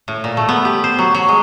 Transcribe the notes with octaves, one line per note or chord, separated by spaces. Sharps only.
A2
A#2
A3
B3
G4
C5
F#3
F#3
G#3